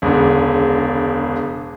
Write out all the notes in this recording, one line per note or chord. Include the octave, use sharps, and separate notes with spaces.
E1 C#2 D3